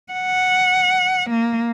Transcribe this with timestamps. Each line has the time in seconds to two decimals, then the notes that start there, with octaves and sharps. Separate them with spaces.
0.13 F#5
1.30 A#3